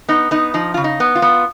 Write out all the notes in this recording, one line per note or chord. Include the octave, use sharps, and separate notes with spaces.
B3 D#4
B3 D#4
F3 D#4
C#3 F4
D#4
B3
F4
B3